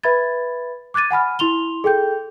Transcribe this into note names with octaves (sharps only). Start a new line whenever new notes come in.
B4 E5 B5 G#6 A6
D6 F#6 G#6 A6 D#7
F#5 G#5 B5 F6
E4 C6 F7 G7
G#4 A4 G5 G6